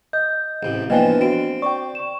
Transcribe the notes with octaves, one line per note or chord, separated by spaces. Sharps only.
D#5 G6
A1 C3
E3 F3 A#3 B3 D4 D#5 G5 G#5
C4 F#4 D7
D5 G5 C#6
C#6 E7